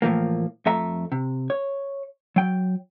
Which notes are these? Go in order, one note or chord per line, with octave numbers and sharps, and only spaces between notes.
A2 E3 F3 A#3
F2 A3 E5 A#5
C3
C#5
F#3 G5